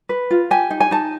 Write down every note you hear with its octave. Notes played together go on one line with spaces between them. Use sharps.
B4
F4
G4 G#5
D#4
G#5
D#4 A5